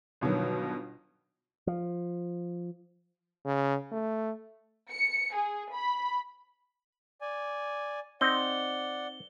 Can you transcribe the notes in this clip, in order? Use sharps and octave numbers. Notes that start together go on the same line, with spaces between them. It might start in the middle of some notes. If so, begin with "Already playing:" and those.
G1 B2 D#3 F#3
F3
C#3
A3
C#7
G#4
B5
D5 G#5
C4 D#4 D5 F#5 G7